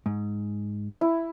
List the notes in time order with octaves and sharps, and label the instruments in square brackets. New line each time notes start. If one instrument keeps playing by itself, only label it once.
[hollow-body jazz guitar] G#2
[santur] E4